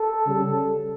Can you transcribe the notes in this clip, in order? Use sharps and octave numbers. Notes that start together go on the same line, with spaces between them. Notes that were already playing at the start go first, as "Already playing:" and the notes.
Already playing: A4
C#3 G3